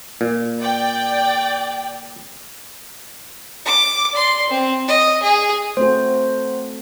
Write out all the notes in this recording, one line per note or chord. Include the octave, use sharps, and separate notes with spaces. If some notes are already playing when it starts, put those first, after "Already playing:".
A#2
D5 G5
D6
D5 C6
C4
D#5
G#4
A3 C4 F#4 C5